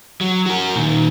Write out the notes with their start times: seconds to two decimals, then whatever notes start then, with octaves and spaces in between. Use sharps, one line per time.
0.21 F#3
0.46 F#4 A#4
0.75 A#2 D#3